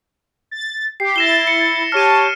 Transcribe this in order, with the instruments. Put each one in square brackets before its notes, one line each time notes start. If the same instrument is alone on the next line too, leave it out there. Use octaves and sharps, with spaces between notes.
[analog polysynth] A6
[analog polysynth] G4 [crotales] C7
[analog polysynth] E4 A6 [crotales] A#6 E7 G7
[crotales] C#7
[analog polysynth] G4 C#5 A5 [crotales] F6 D#7